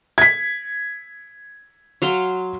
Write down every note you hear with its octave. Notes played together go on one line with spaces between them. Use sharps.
G#6 B6
F#3 F5 C6